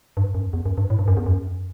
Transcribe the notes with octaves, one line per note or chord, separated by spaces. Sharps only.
G2
F#2
E2
F#2
G2
A2
G2
F#2
E2
F#2